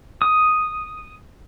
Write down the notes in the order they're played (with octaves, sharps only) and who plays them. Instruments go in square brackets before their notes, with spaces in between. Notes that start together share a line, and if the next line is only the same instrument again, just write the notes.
[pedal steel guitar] D#6